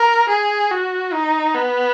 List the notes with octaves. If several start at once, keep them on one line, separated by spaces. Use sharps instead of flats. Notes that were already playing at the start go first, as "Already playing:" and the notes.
Already playing: A#4
G#4
F#4
D#4
B3